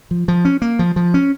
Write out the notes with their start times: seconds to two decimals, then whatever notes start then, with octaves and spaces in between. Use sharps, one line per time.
0.11 F3
0.28 F3
0.45 C#4
0.62 A#3
0.79 F3
0.96 F3
1.14 C#4